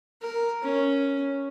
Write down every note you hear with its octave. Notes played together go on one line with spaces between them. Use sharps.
A#4
C#4